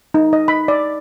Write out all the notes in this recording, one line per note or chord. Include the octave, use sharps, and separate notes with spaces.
D#4
D#5
B5
D5